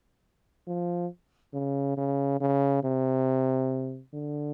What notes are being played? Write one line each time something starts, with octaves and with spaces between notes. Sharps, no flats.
F3
C#3
C#3
C#3
C3
D3